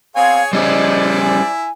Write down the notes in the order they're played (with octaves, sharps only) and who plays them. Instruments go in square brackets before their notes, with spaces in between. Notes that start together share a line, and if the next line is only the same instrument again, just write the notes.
[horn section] B3 C4 [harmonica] G#4 C#5 G#5 [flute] F5
[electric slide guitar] G3 C#4 G#4 [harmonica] E4 [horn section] C5 D5 [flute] D#5
[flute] G#5